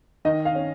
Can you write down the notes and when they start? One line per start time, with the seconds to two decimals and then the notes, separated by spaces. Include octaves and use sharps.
0.25 D#3 D#5
0.45 F5
0.55 C#4